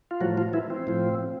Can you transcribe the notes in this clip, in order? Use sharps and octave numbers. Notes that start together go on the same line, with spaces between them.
F4
A2 F3 F#3 F#4
F3 F4
E3 E4
C4
A2 F3